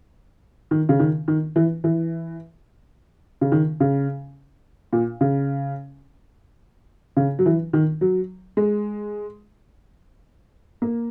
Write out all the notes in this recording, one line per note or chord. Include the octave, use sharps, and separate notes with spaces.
D#3
C#3
D#3
D#3
E3
E3
C#3
D#3
C#3
A#2
C#3
C#3
F#3
E3
D#3
F#3
G#3
A#3